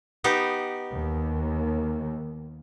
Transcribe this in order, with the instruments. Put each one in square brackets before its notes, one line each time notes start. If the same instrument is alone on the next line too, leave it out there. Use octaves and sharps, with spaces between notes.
[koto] B3 D#4 G4
[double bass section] D#2